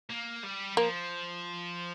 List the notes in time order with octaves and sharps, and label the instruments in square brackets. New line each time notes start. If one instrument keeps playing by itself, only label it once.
[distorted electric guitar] A#3
G3
[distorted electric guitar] F3 [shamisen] A#3